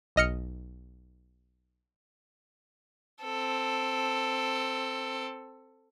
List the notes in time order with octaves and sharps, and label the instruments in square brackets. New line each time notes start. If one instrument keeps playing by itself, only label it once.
[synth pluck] B1 D#5 F6 C#7
[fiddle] C4 A4